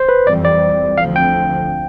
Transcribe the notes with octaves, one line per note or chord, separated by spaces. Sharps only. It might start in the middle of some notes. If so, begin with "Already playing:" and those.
Already playing: C5
B4
F2 E3 G3 C4 D5
D5
D2 D3 F3 C4 F5
G5